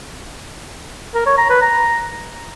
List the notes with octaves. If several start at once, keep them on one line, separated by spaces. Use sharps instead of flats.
A#4
C#5
A#5
B4
A#5